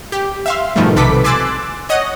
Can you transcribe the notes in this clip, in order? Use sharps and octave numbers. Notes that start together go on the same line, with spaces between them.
G4
E5 F5 C6
G#2 B2 D#3 F3 G3 A3
B1 C3 A4 B4 D6 B6
G#5 C6 D6 E6 F#6 A6
C#5 D#5 F#5 A#6